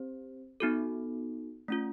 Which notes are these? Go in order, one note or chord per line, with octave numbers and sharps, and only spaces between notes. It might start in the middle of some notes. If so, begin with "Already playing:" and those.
Already playing: C4 G4 C5
B3 D#4 F#4 A4
A3 C#4 F4